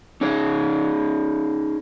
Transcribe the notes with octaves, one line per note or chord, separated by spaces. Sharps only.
C#4 D#4 G#4 C#5